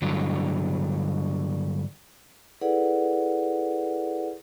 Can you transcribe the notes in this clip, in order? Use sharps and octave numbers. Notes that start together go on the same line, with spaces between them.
G2 D3 F#3
E4 G#4 A4 B4 D5 F#5